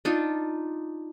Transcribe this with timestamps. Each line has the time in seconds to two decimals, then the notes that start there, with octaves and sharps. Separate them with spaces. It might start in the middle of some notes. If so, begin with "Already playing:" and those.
0.05 D4 D#4 F4